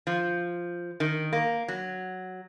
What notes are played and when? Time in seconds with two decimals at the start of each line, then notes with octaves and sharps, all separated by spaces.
0.07 F3
1.00 D#3
1.33 A#3
1.68 F#3